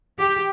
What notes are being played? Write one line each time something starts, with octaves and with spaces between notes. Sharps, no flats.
G4